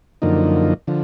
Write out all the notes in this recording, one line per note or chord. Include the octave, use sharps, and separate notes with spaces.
F#2 D3 F3 A#3 D#4
D3 F3